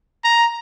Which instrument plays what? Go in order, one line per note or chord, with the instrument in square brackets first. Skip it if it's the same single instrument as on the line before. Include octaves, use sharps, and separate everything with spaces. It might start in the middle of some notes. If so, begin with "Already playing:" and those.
[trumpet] A#5